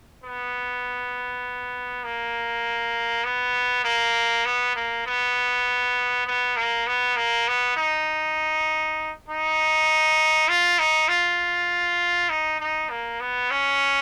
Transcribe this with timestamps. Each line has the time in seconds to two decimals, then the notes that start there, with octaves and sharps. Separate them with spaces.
0.24 B3
2.04 A#3
3.24 B3
3.85 A#3
4.45 B3
4.76 A#3
5.06 B3
6.27 B3
6.56 A#3
6.87 B3
7.17 A#3
7.48 B3
7.77 D#4
9.29 D#4
10.49 F4
10.79 D#4
11.09 F4
12.30 D#4
12.60 D#4
12.90 A#3
13.21 B3
13.51 C#4